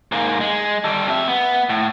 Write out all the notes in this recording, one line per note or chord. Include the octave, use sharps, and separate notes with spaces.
G#2 A#3
G#3
G3 A4
F2 E5
B3
A2